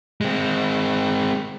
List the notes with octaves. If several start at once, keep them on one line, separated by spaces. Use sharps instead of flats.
G#3 C4